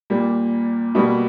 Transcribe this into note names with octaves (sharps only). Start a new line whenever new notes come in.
A#2 G3 A#3
B2 G3 A#3